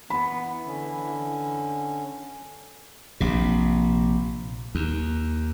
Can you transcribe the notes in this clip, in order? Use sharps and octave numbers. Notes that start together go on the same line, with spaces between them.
E3 B3 B5
D3 C#4
A#1 C3
D#2